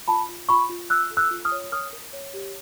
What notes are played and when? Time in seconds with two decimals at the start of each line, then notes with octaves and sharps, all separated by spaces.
0.08 F4 A5 B5
0.29 F4
0.49 F4 B5 C#6
0.70 F4
0.90 F4 E6 F#6
1.11 A4
1.17 E6 F#6
1.31 F4
1.45 D#6 F6
1.52 C#5
1.72 A#4 D#6 F6
1.93 A#4
2.13 C#5
2.34 G4